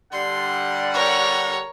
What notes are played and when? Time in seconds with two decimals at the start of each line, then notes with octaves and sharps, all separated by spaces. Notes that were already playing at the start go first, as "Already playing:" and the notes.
0.12 D3 G3 F#5 C6
0.94 A#4 C#5